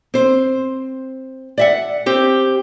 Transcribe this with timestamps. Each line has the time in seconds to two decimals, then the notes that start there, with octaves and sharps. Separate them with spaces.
0.14 C4 C5
1.58 D5 E5 F#5
2.06 C4 G4 C5